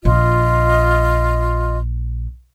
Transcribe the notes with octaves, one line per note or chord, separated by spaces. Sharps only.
A#1 F4 D#5